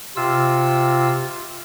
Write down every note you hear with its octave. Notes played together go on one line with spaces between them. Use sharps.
C3 F4 E6